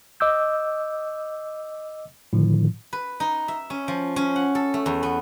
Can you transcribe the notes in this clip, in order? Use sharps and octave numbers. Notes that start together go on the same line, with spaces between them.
D#5 D6 E6 G6
A2 D3 D#3 F3
B4
D#4
E5
C#4
F3
C#4
F#5
A4
A3
E2
B3